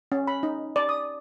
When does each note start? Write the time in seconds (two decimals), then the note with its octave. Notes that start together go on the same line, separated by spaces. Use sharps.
0.12 C#4
0.27 B5
0.43 D#4
0.76 D5
0.89 D#6